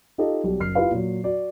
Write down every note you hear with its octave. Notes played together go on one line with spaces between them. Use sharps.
D#4 F4 G4 A4 D#5
B1 G3
F#1 F6 C7
E4 F4 G4 B4 F5
A#2 F#3
F#4 D5